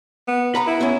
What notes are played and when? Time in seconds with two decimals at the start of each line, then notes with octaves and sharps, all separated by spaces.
0.28 B3
0.55 B4 A#5 B5
0.67 E4
0.81 B3 C#4